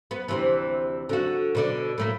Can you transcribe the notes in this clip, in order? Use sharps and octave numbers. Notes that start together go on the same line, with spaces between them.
B3
D2 C3 E3
D3 F#4
B2 D3 D5
A2 A3 A#3